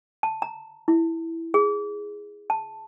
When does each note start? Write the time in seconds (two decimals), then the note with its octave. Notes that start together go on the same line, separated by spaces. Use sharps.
0.23 A5
0.42 A#5
0.88 E4
1.54 G#4
2.50 A5